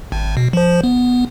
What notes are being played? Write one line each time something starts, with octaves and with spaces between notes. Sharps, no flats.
G#1
B2
F3 C5
B3